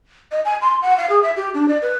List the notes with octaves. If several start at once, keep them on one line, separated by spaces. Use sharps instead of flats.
D#5
G#5
C6
F#5
F5
G#4
E5
G4
D4
D5
B4